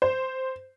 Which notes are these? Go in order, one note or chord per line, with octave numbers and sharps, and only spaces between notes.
C5